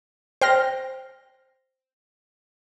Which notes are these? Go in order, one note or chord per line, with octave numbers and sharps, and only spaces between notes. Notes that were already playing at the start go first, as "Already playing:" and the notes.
C5 G5 F6 A#6